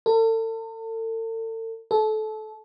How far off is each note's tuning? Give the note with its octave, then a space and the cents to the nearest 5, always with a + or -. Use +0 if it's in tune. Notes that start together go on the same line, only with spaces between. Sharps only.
A4 +40
A4 -25